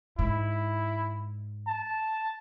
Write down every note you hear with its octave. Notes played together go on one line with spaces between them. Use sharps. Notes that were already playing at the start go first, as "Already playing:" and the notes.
G#2 E4
A5